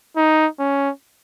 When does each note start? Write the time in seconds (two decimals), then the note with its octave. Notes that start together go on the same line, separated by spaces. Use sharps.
0.17 D#4
0.60 C#4